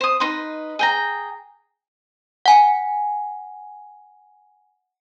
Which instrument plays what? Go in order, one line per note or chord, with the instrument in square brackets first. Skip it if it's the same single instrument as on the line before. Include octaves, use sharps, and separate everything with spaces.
[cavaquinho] C5 D#6
D#4 B4 C6
G#4 G5 A#5
[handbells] F#5 G#5